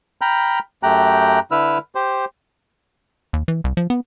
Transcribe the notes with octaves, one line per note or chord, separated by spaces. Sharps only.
G5 A#5 B5 F6 G6
F#2 A3 G4 G5 A#5 F#6
D3 E4 B4 E6 F6
G4 C5
D#2
E3
C2
F3
B3